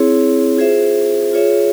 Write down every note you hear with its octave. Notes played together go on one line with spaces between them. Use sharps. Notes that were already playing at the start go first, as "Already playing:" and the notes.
Already playing: C4 E4 G#4 C#5
F4 G#4 C5 E5
F4 G#4 C#5 E5